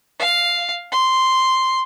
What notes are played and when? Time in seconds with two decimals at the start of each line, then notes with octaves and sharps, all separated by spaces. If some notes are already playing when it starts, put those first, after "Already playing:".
0.20 F5
0.92 C6